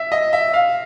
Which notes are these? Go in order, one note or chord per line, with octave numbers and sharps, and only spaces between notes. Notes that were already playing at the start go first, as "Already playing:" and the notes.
Already playing: E5
D#5
E5
F5